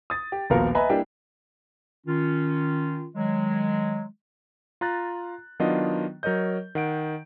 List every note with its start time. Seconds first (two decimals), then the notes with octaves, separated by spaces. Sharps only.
0.10 D#6 A6
0.32 G4
0.50 D#1 A#1 B3 F#4 A#4 F5
0.75 B4 D#5 E5 G#5 A#5 B5
0.90 G3 A#3 D4 E4 G4
2.06 D#3 C#4 F4
3.15 D#3 F#3 G#3
4.81 F4 A#5 F#6 A6
5.59 D#3 F#3 B3 D4 F4 D#5
6.23 F#3 A#4 C#5 D#5 G6
6.75 D#3 F#5 D7